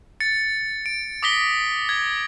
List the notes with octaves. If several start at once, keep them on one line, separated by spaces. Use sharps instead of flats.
A6 C#7
D7
D6 D#6 A#6 B6 G7
G#6